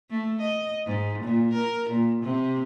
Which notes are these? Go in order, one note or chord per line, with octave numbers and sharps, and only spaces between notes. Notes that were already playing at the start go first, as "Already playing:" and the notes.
A3
D#5
G#2
A#2
A#4
A#2
C3